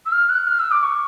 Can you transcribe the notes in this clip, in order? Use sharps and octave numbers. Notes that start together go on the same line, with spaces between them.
E6
F6
F#6
F6
E6
D6
C#6